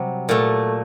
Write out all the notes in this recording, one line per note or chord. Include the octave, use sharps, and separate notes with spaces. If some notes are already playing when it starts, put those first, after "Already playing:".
Already playing: C3 F#3 G3
A#2 A3